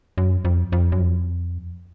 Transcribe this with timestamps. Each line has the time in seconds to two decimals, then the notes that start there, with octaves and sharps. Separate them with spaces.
0.18 F#2
0.45 F2
0.72 F2
0.92 F#2
1.00 F2